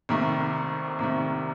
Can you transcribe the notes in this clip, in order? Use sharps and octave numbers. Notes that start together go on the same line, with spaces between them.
C2 C3 D#3 A3
C2 C3 D#3 A3